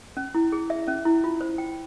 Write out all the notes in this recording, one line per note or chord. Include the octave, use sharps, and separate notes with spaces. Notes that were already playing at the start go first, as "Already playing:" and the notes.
C#4
E4
G#4
E5
C#4
E4
F4
C5
G5